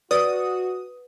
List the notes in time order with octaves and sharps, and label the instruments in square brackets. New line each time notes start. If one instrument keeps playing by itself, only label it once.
[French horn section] F#4 [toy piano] B4 [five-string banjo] D5 [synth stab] D#6